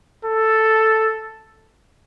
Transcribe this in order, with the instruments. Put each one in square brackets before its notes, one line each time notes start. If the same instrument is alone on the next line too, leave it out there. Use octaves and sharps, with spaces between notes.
[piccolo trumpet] A4